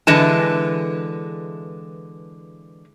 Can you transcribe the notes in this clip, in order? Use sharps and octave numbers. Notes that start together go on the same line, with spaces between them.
D3 E3 G#3 B4 A5